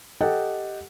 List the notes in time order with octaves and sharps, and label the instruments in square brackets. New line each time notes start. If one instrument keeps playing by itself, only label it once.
[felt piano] G4 A4 D#5 F#5 G5